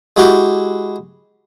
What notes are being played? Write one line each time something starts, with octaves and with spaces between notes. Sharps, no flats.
G#3 E4 F#4 G4